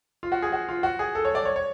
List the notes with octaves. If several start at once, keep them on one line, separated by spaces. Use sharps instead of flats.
F4
F#4
G#4
F#4
F4
F#4
G#4
A4
C#5
D5
C#5
C#5